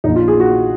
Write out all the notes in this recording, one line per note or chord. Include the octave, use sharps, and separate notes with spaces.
A#1 A#2 D#4
F4
G#4
F#4